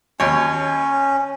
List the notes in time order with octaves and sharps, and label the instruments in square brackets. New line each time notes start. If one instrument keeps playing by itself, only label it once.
[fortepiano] D#2 C#5 [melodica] C#4